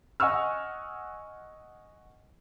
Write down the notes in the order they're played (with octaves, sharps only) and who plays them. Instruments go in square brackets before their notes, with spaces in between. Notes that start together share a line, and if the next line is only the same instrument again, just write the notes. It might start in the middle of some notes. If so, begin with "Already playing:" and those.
[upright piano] D#5 F#5 G#5 C#6 E6 F6